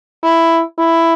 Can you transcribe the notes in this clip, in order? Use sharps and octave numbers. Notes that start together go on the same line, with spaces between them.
E4
E4